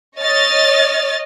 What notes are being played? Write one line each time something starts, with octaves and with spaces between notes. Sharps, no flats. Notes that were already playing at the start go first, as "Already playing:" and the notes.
C#5 D#5 F6 A6